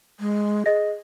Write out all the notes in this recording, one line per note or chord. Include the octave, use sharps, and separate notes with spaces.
G#3
G#4 D#5 A#6